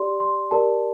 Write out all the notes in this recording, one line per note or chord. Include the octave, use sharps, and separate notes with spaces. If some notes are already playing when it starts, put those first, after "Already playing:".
Already playing: G4 D5 C6
C6
G4 A#4 D5 A5